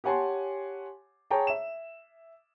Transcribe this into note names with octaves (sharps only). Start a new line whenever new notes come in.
G4 C#5 F#5 G#5 A5 C6
G#4 C#5 G5 A5 A#5
E5 E7